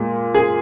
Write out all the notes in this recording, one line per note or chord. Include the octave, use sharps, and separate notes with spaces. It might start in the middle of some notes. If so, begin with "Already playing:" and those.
Already playing: A#2 G#3
G#4